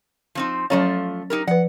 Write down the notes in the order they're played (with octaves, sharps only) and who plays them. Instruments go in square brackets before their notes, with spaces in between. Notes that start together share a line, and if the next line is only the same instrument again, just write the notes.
[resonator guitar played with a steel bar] F3 C4 D#4
[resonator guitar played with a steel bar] F3 A3 F4 [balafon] F#3 C#4 C#5
[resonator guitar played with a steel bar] D#4 G4 A#4
[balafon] F3 B4 [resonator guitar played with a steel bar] F#5